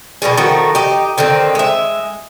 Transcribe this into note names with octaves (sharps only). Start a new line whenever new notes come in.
B2 D3 G3 G#4
D#3 F3 A3 F#4
D#4 G4
D3 D#3 A#3 C4
G#3 E5